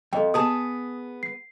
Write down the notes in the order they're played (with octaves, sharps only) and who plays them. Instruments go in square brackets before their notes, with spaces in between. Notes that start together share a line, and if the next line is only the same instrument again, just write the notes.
[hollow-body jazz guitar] F2 [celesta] A4 D#5 G5
[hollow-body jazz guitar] B3 G#4 A5 [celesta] D#6
[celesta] C7